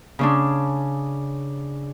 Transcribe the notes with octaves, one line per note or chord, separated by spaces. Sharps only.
C#3 C#4 D4